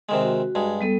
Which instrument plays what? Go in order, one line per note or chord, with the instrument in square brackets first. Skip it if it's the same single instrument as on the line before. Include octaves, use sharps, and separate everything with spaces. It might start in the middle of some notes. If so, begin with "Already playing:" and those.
[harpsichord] C3 D#3 G#3
[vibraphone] F#4
[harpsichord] G2 G#3
[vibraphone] G3 B3 A4